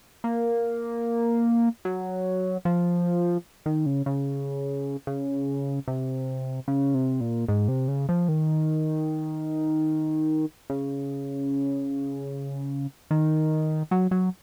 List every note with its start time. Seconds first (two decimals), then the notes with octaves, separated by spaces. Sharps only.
0.24 A#3
1.85 F#3
2.65 F3
3.66 D#3
3.86 C#3
4.06 C#3
5.07 C#3
5.88 C3
6.68 C#3
6.94 C3
7.21 A#2
7.48 G#2
7.68 C3
7.88 C#3
8.09 F3
8.28 D#3
10.70 C#3
13.11 D#3
13.91 F#3
14.11 F#3